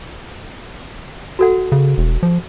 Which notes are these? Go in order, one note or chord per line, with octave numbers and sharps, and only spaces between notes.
F#4 A4 F#5
C#3
E1
F3